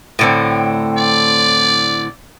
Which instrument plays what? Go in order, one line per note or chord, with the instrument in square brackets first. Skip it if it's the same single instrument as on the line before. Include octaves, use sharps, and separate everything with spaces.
[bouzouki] A2 D3 C4
[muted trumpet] D5